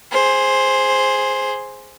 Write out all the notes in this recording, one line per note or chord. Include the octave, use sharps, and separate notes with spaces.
G#4 C5